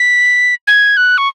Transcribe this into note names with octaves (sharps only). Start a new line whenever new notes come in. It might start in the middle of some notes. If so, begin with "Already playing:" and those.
Already playing: B6
G#6
F#6
C#6